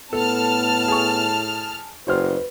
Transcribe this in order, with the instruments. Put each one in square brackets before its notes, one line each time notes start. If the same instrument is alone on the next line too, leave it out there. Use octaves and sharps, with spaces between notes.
[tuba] A2 [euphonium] B3 [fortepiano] A4 [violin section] A5 F6
[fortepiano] G#4 C#6
[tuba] F#1 [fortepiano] F#4 C5 F6 [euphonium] B4